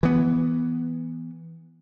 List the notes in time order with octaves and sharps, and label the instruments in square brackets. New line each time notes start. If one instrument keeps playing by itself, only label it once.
[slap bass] E3 B3